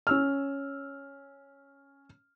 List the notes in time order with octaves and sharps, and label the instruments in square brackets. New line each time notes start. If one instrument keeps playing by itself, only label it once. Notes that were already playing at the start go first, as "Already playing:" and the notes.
[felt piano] C#4 E6 F6